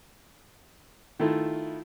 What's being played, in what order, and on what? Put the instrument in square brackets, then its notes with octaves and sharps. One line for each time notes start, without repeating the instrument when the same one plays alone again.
[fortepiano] D#3 A3 E4 F4